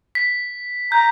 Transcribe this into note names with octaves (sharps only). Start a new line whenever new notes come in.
B6
A#5 G6